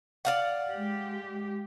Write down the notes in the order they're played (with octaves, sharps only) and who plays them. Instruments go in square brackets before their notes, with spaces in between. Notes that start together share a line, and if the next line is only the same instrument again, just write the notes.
[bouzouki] D5 F5 F#5
[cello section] G#3 G4